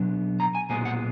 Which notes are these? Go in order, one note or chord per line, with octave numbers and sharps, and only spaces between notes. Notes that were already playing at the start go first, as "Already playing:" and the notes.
Already playing: B2 F#3 B3 D4
A#5
G#5
B1 A#2 G#3 B3 G#5
F#5